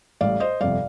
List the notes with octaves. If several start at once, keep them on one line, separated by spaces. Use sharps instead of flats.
A1 A2 G3 D5 F5
C5 D#5
G1 F2 C3 D5 F5